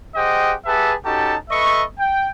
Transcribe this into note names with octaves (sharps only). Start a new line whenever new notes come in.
G4 G#4 C5 D#5 F#5 G5
G4 G#4 B4 E5 F#5 A5
C#4 D#4 F#4 G4 A4 A5
A4 B4 D#5 E5 C#6
G5